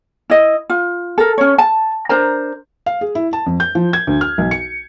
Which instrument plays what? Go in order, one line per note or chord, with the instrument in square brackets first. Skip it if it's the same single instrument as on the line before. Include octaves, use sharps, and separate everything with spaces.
[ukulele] E4 D#5
F4
A4 A#4
C#4 C#5
A5
D4 A#4 C5 A#5
[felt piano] F5
G#4
E4
A5
F2
G6
F3
G#6
D2
F6
B1
C#7